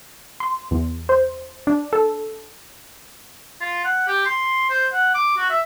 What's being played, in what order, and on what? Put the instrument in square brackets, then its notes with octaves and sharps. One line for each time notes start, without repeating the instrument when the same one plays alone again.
[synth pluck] C6
E2
C5
D4
A4
[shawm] F4
F#5
G4
C6
C5
F#5
D6
F#4
E5